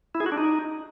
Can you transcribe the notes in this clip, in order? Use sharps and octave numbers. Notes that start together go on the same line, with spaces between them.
E4
G#4
F#4
D4
D#4